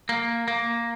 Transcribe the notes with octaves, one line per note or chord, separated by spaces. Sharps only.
A#3
A#3